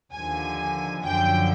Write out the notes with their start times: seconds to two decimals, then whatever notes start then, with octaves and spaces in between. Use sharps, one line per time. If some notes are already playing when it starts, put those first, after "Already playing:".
0.12 D#2 D3 F3 G#5
1.03 F#2 D3 F3 G5